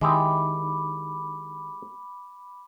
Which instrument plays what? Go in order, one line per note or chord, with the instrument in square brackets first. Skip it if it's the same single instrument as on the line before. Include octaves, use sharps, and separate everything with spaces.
[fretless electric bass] D#3 [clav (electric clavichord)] G#3 E4 G4 [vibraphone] B5 D6